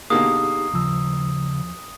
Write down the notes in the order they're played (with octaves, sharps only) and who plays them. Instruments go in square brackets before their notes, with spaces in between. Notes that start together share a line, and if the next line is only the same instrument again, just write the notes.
[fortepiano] B2 D3 A#3 [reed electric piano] D#4 G4 G#4 [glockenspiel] D#6
[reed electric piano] D#2 F3 E6 [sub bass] C#3